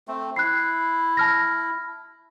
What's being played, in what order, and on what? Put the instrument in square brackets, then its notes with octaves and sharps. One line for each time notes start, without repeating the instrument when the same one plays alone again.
[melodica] A3 C4
[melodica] E4 [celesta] F#6 C7
[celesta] A5 F6 A#6